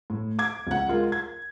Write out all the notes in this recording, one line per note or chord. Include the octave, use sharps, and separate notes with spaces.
A2
D6 G#6
C#2 F#5
G#3 F4 A#4
G#6